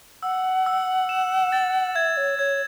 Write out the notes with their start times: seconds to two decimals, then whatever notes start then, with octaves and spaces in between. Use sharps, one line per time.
0.23 F#5 E6
0.66 E6
1.09 E7
1.52 A6
1.95 E5 G#6
2.17 C#5
2.39 C#5 G#6